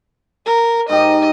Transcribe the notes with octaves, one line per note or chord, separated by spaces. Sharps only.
A#4
G#2 D#4 G4 D#5